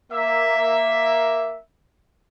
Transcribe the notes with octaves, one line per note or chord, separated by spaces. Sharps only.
A#3 E5